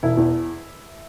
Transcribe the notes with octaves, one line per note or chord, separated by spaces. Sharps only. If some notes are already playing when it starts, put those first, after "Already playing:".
E1 E4
E2